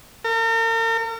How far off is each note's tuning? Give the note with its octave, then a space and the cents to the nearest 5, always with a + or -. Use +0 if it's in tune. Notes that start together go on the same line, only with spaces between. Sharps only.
A#4 -40